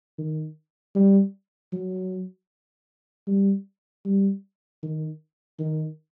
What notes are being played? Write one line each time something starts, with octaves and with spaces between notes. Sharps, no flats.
D#3
G3
F#3
G3
G3
D#3
D#3